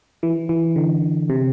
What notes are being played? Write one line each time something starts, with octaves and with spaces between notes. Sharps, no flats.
E3
E3
D3
C3